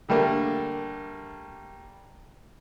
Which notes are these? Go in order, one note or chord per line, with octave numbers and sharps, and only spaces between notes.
D3 G3 A3 A#3